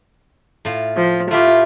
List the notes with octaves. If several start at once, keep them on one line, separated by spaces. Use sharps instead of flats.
A2 F4
F3
A3 E4 F4 G4